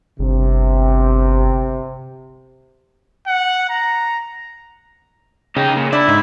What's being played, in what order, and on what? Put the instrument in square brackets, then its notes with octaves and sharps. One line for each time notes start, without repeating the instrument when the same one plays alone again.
[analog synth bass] G1 [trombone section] C3
[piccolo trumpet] F#5
A#5
[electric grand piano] C#3 [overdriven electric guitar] D#4 G4
[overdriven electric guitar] A#2
[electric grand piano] D4 D5 [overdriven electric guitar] E4
[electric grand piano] G#2 D#4